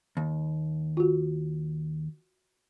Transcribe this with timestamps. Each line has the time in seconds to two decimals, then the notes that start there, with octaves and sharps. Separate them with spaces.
0.17 D#2
0.97 F4 F#4